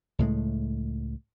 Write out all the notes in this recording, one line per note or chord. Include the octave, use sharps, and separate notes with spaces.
C#2 A2 G#3 A3